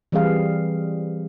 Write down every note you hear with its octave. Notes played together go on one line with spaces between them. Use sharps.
E3 G3 C4 G#4 F5